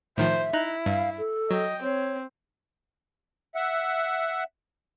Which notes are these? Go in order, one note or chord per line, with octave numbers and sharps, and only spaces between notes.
A2 D#3 F3 C5 E5
D#4 E4 A#5 F#6
G2 F5
A4
F#3 D#5 G5
C4 C#5
E5 F#5